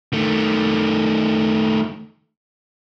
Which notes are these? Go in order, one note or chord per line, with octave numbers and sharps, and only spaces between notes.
D#3 A3